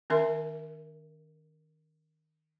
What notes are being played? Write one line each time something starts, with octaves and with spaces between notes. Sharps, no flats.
D#3 C#4 A#4 E5 C6